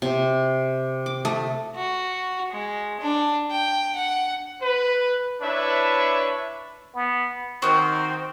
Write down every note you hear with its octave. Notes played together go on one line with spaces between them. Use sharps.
C3
D6
A3
F#4
G#3
D4
G5
F#5
B4
D4 E4 B4 C#5 E5
B3
D#3 C4 F#4 D#6